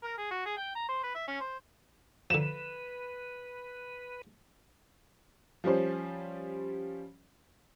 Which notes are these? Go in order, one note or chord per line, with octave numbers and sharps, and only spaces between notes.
A#4
G#4
F#4
G#4
G5
A#5
C5
B4
E5
C#4
C5
D3 F3 B4 E7
F3 G3 C#4 C5